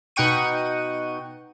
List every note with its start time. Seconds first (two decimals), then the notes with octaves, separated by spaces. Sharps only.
0.16 B2 D#4 F#5 G5 C#6 D#7